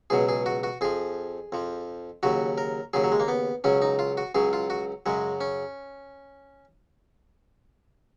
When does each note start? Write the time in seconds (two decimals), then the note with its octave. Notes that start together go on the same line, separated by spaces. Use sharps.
0.10 C#2 B2 F#3 G#4
0.29 G#4
0.46 F#4
0.63 F#4
0.81 F2 F3 G#4
1.52 F2 F3
2.23 D#2 C#3 F#3 F#4
2.58 A#4
2.93 D#2 C#3 F#3 G#4
3.04 F#3
3.12 G#3
3.20 A#3
3.28 B3
3.64 C#2 C#3 F#3 C#4
3.82 D#4
3.99 F4
4.17 F#4
4.35 C#2 C#3 F#3 G#4
4.53 F4
4.70 F#4
5.06 F#2 C#3 F#3 G#3
5.41 C#4